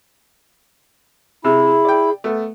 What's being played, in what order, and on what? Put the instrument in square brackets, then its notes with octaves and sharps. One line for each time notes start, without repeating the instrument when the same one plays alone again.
[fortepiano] C3 [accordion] E4 [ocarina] G#4
[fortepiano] D5 G5
A3 B3